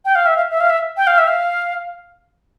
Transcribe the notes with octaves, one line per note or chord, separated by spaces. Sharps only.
G5
F5
E5
F5
E5
F5
E5
G5
F5
E5
F5